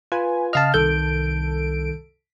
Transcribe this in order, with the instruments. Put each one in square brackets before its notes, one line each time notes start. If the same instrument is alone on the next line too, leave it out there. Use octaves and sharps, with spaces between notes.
[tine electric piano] F4 [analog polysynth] B4 G#5
[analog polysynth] C#3 F6 [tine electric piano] D#5 F5 A5
[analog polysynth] C2 A4 D7 [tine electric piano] D#3 G6